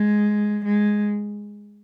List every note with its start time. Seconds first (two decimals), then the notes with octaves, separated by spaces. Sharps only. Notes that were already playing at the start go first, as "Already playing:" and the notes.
Already playing: G#3
0.65 G#3